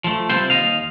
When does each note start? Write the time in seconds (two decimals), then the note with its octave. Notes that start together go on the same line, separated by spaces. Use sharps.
0.04 F3 A3
0.29 C3 G3 C4 E4 F4 C5
0.50 D#2 D#5 F5